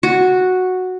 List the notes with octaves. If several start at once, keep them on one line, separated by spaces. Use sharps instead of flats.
F#4